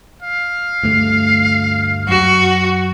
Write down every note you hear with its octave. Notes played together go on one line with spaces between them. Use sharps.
F5
D2 G2 A3
F#2 F#4